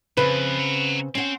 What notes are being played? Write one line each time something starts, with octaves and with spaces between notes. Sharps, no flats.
F2 C#3 C4 B4
F#5 A#5
C4 C#4 F#5